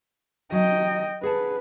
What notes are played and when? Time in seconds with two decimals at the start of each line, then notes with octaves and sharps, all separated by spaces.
0.52 F#3 D#5 G5
1.23 G#4 B4 F#5 A5